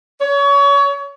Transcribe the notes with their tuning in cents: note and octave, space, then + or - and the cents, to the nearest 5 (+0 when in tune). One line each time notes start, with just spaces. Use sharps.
C#5 +30